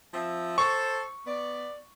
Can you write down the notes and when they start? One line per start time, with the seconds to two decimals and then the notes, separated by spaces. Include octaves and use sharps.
0.14 F3 C4 E5
0.58 A4 C5 C#6
1.27 B3 D5